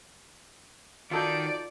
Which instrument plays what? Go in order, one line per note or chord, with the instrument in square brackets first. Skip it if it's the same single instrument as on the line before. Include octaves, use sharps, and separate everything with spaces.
[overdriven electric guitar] D#3 [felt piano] D#4 F#4 [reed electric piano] F4 A4 G6 [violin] D5